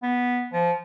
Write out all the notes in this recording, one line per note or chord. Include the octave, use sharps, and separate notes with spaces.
B3
F3